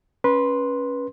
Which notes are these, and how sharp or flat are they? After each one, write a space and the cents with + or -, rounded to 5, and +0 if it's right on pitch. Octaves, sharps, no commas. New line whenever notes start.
C#4 +0 B4 -20 C6 +0